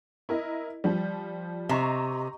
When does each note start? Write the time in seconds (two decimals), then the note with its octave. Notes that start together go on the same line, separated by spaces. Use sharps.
0.29 E4 A#4 D#5
0.84 F3 G3
1.69 C3 D#5 A#5 C#6